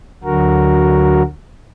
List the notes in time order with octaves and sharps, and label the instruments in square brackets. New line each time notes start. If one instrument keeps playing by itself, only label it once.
[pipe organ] D2 D3 F#3 F#4 A#4